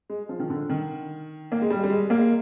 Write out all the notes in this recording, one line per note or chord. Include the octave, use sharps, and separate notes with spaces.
G#3
F3
D#3
D3
D#3
A#3
G#3
G3
G3
G#3
A#3